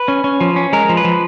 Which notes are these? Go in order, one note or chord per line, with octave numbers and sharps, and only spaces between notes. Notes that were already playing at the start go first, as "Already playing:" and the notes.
Already playing: B4
C#4
C#4
F3
C#4
G#3 A#4
F3
B4
F3